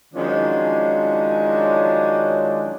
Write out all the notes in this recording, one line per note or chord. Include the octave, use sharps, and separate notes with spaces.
D#3 F3 F#3 G#3 C#4 D4